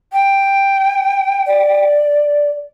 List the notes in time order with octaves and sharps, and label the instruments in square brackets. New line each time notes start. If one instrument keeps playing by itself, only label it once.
[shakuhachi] G5
[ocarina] D5